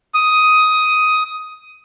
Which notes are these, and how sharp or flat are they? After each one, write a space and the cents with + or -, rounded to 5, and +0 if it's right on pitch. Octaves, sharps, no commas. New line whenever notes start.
D#6 +10